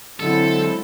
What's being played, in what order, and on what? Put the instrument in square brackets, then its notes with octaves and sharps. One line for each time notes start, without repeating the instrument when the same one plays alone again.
[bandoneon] D3 [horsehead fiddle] F#3 C4 [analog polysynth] G#3 E4 [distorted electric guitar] A4